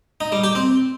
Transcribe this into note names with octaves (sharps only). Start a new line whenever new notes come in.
D#4
G3
G4
C4